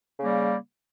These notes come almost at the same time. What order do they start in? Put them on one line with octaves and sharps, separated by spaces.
C#3 A#3 G3